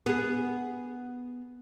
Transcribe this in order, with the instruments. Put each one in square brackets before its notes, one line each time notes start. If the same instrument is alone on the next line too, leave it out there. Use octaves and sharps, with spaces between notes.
[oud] B3 G#4